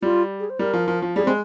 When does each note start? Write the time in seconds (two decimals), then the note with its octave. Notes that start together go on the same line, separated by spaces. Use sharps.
0.02 G3 F4
0.40 G#4
0.50 C5
0.59 G3 A#4
0.73 F3
0.88 F3
1.02 F3
1.16 G3 G#4
1.25 G#3 C4